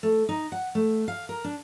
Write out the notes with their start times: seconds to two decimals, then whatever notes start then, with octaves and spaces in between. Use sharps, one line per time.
0.03 A3
0.29 D#4
0.52 F#5
0.75 A3
1.08 F5
1.29 A#4
1.44 D4